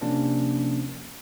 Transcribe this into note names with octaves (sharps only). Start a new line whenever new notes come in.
C3 F3 A#3 C#4 D4